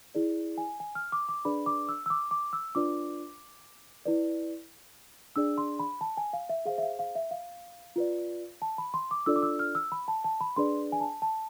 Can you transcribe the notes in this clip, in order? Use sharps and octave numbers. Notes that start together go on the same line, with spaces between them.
E4 G#4 D5
G#5
G#5
F6
D6
D6
D4 G#4 B4 D5 B5
D6
E6
E6
D6
D6
E6
D4 F4 B4 D5 D6
E4 B4 D5
D4 G#4 D5 E6
C6
B5
A5
G#5
F5
E5
G#4 C5 F5
E5
F5
F5
E5
F5
F4 B4 D5
A5
B5
C6
D6
D4 F4 A4 D5 E6
D6
E6
F6
E6
B5
A5
A5
B5
D4 G#4 B4 D5 C6
G#5
A5
A5